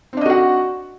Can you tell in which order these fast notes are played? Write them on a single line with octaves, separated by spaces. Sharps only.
C4 D4 D#5 F#4 F#5